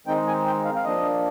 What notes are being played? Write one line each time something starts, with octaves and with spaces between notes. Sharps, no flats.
D#3 G#3 C4 D#4 G5
G#5
G5
F5
F5
F3 A#3 D4 D#5